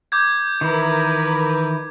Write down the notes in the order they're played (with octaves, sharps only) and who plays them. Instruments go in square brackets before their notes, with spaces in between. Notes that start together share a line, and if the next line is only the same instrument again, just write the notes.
[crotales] D6 G6 G#6
[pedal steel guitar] D#3 E3 E4 [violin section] A#4 B4